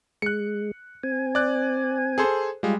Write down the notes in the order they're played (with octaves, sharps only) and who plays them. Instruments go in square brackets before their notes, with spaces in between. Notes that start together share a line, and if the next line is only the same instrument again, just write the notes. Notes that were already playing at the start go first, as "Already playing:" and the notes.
[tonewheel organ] G#3 [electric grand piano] F#6 C#7
[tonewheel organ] C4 G#5
[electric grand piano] D5 F#6
G#4 A4 C5
[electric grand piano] G3 G#3 [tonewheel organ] F4